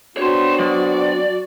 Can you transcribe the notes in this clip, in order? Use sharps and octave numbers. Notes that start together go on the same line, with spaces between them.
B3 C4 D4 F#4 C#5 C6
F#3 D5